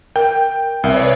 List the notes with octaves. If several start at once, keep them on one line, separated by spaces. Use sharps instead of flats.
A#4 G5
C2 A#4 B4 C#5 D5 E5